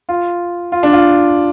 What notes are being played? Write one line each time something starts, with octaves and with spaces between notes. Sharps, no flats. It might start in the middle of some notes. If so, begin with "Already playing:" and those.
F4
F4
D4
F4